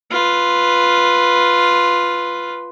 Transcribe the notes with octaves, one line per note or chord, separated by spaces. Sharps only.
F4 B4